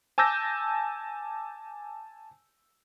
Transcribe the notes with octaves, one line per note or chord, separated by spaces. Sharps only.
G#5 A5 D6 E6 G6 A#6